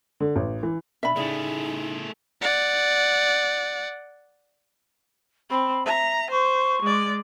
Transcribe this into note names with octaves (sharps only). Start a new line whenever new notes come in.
D3
A1
E3
B2 D4 E5 B5
A2 C#3 A3 D#4 G#4
D5 F#5
C4 B5
E5 A#5
C5 C#6
G#3 D5